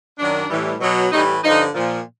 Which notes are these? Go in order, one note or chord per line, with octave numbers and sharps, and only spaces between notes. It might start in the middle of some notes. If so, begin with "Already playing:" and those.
F#2 D#3 F#3 D4
A2 E3 G3
B2 F#3
A2 E3 G3 D#4
G2 D3 F3 D#4
A#2 F3